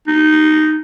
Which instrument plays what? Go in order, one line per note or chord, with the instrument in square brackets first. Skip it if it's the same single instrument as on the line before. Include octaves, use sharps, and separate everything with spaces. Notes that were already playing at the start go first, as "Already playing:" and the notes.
[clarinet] D#4